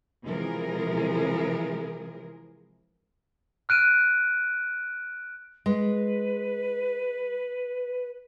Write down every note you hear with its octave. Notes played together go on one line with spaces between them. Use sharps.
C3 E3 F3 G#3 G#4 A#4
F6 F#6 D7 D#7
G#3 B4